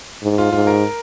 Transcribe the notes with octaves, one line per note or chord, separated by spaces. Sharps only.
G#2
F4
G#2 F4
A#4